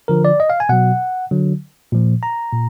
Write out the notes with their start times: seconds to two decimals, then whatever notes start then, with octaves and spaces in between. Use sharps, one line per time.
0.08 D3 F3 A#4
0.25 D5
0.40 D#5
0.50 F5
0.60 G#5
0.69 B2 F#3 F#5
1.31 D3 F#3
1.92 A#2 F3
2.23 A#5
2.52 A#2